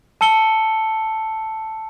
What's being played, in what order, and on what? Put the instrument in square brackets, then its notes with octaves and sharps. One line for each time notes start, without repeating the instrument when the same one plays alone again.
[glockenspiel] A5 E6 C#7 G7